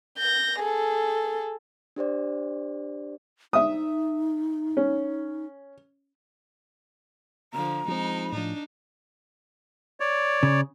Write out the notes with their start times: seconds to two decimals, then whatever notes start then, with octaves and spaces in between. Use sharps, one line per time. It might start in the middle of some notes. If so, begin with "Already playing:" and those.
0.18 G6 A#6
0.60 G#4 A4
1.96 D4 G4 C5 D5
3.53 D#4 E5 D#6
4.77 C#4
7.53 D3 F3 A#5
7.88 F3 G#3 C4 D#4
8.32 A2 F3 D4 D#4
10.00 C#5 D5
10.43 C#3